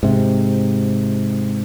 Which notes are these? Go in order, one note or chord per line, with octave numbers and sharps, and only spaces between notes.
G#2 C3